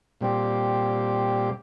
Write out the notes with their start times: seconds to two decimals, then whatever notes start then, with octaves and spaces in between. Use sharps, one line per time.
0.21 A#2 G3 C4 G4